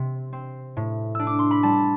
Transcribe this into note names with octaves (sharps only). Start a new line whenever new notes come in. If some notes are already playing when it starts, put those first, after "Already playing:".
Already playing: C3 C4
C4
A2
D4 E6
D6
C6
B5
G3 A5